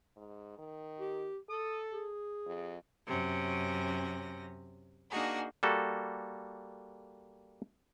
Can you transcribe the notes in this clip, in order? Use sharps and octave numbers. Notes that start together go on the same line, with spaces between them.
G#2
D#3
G4
A4 D#6
G#4
F2
F#2 C3 C#4 A#6
A#3 D4 D#4 F#4 G#4
G3 A#3 F#4 A4